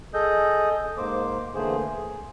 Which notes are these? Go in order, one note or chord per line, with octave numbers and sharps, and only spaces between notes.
G#4 A4 D#5 D#6 G6
G#2 A#3 C5 D6
D3 E3 A3 A#3 G#4 C5
G#4